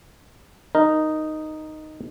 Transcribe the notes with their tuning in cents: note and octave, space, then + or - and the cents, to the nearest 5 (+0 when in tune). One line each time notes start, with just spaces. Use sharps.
D#4 -5 A#4 +0